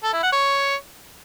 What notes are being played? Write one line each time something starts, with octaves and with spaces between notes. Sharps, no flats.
A4
E4
F#5
C#5